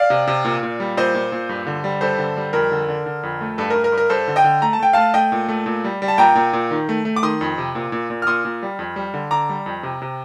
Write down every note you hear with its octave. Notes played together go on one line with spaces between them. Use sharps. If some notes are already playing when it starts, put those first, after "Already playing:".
Already playing: D5 F5
C3
C3
A#2
A#2
G3
A#2 C5 D#5
A#2
A#2
G2
D3
G3
G2 A4 C5
D3
G3
F2 A#4
D3
D3
D3
F2
A3
G2 A4
G2 A#4
A#4
G2
A#4
G2 A4 C5
D3
D#5 G5
D3
A3 A#5
A5
A3 G5
A3 F5 A5
A3 D#5 G5
A#2
A3
A#2
G3
G3
A5
A#2 G5 A#5
A#2
A#2
D#3
A3
A3
D6
D#3 C6 D#6
F2
C3
A#2
A#2
A#2
F6
A#2 C6 D#6
A#2
G3
F2
G3
D3
D3 A#5 D6
G3
F2
C3
C3